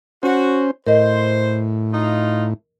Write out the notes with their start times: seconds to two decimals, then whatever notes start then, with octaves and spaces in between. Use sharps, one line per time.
0.23 C#4 F#4 C5
0.87 A2 A#4 C5 D#5
1.92 D#4 F4